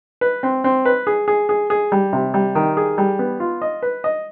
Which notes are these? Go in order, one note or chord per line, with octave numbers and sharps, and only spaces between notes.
B4
C4
C4
B4
G#4
G#4
G#4
G#4
G3
C3
G3
D#3
G#4
G3
B3
F4
D#5
B4
D#5